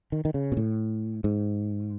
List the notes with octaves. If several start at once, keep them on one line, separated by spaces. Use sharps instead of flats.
D#3
D#3
C#3
B2
A2
G#2